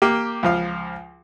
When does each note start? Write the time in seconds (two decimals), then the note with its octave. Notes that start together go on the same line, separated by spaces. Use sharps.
0.02 A#3 G4
0.43 C#2 F3 F5